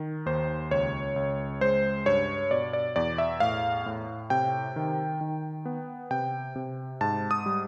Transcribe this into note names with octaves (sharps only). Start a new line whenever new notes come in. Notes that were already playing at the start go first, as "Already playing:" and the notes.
Already playing: D#3
D#2 C5
C#2 C#5
C#2
G#3 C5
G2 C#5
B2 D5
D5
E2 D5
E5
A2 F5
A2
C3 G5
D#3
D#3
B3
C3 G5
C3
G#2 A5
D#6
G3